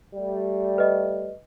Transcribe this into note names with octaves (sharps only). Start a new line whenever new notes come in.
G3 A3
B4 D#5